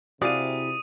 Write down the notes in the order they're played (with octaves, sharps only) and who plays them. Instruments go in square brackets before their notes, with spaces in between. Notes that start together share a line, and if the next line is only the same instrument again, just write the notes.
[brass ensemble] C3 [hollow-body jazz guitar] E4 F#4 G#4 [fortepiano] D5 F5 [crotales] D#6 D#7